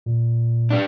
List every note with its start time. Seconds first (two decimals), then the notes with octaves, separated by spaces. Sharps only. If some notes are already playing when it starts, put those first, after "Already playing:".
0.06 A#2
0.70 G3 D4